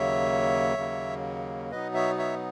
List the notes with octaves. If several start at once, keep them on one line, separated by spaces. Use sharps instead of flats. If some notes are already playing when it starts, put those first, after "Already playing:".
Already playing: D#2 C#3 F#3 A#3 C#5 E5
D#2 C#3 F#3 A#3
B2 F#3 B3 D#4 B4 D#5
C#5 E5
C#5 E5